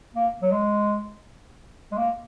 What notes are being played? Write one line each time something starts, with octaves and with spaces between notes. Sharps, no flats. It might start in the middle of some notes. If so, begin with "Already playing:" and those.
A#3
F#3
G#3
G#3
A#3